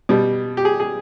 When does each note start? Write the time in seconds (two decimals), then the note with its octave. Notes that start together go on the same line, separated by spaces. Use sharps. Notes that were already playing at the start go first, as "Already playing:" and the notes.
0.09 B2 G3
0.57 G4
0.65 G#4
0.80 G#4